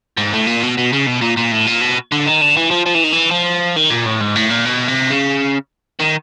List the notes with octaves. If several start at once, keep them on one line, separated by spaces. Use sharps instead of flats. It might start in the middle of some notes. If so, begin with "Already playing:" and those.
G#2
A2
A#2
B2
B2
C#3
B2
A#2
A#2
A2
A#2
B2
D3
D#3
D3
E3
F3
F3
E3
D#3
E3
F3
D#3
A#2
A2
G#2
A2
A#2
B2
C3
C#3
D#3